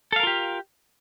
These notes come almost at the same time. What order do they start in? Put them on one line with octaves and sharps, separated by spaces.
A4 F5 A#4 F4 G4